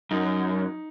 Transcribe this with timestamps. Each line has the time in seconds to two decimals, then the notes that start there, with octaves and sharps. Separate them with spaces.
0.11 F#2 D#4